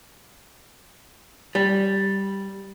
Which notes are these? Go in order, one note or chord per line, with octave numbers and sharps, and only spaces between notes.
G3